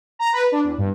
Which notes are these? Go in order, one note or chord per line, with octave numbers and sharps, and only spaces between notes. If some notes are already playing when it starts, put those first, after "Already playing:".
A#5
B4
D4
E2
G2